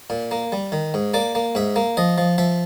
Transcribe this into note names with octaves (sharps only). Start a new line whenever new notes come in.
A#2
A#3
G3
D#3
G#2
A#3 D5
A#3
G#2 E5
A#3
F3 D#5
F3
F3 E5